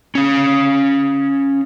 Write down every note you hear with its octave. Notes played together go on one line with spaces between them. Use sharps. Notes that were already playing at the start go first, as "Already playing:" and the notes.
C#4 F5